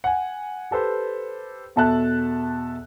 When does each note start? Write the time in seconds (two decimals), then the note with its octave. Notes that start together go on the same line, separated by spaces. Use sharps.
0.04 F#5 G#5
0.71 G4 A4 B4 C5
1.76 E2 B2 A4 E5 A5 F#6